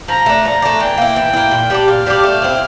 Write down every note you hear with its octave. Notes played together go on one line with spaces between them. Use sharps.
F3 A#5
A3 D4
F3 A#5
A3 D4
E3 G5
A#3 E4
E3
A#3 E4
A#2
G3 D4 G4
A#2 F5
G3 D4 G4
A3
C4 E4